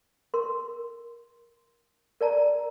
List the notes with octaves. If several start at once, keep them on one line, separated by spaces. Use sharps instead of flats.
A#4 C6
A#4 D5 A5 A#5